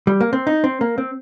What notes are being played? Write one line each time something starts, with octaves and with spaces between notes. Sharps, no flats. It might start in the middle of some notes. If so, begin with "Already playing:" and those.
G3
A#3
C4
D#4
C4
A#3
C4